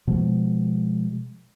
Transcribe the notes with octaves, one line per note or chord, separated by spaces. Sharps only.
B2 F3 G#3